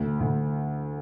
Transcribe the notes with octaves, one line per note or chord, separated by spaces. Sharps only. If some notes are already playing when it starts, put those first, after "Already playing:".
Already playing: D2
D2